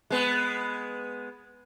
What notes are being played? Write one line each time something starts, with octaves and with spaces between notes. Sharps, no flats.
G#3 B3